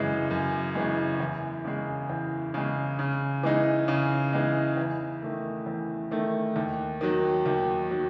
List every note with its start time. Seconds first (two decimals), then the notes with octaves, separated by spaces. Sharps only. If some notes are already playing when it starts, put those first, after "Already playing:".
Already playing: F#2 C#3 E3 G#3
0.31 F#2
0.75 C#3 E3 G#3
1.20 E2
1.65 C#3 G#3
2.09 E2
2.54 C#3 G#3
2.99 C#3
3.43 E3 G#3 D#4
3.88 C#3
4.33 E3 G#3 D#4
4.77 E2
5.22 D#3 A3
5.66 E2
6.11 D#3 A3
6.56 D#2
7.01 D#3 F#3
7.46 D#2
7.91 D#3 F#3